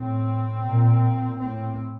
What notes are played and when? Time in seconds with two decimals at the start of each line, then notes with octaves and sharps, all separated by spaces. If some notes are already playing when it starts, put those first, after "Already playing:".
Already playing: A2 C4
0.67 A#2
1.39 A2 C4